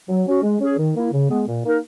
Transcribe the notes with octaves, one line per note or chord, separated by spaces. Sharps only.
F#3
C#4 F#4
G#3
C#4 G#4
D#3
A#3 E4
C#3
G#3 B3
A#2
A#3 D#4 A#4